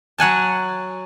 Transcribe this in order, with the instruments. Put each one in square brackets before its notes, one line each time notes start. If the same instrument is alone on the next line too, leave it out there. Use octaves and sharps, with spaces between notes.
[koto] F#3 F#5 G#5 A5